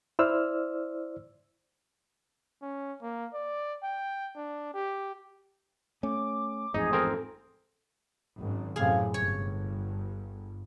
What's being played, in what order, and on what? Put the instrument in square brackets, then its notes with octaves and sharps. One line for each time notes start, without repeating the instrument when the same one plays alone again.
[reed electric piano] E4 C5 D5 E6 F6
[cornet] C#4
A#3
D5
G5
D4
G4
[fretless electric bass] A3 C#4 [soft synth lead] D6
[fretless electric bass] A1 F2 G#2 [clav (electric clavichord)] D#4 [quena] G#4
[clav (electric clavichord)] C4 A#4 [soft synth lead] A4
[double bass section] G#1 F#2
[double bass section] F#2 A2 C3 [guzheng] G#4 F5
[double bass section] G1 G2 [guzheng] C#5